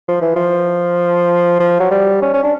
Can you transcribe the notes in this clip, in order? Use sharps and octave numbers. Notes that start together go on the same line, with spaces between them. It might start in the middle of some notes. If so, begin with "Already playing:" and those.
F3
E3
F3
F3
F#3
G3
C#4
C#4
D4